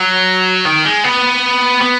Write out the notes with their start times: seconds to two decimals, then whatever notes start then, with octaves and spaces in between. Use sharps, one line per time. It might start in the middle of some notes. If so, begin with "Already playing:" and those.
Already playing: F#3
0.66 D#3
0.85 G#3
1.04 B3
1.82 B3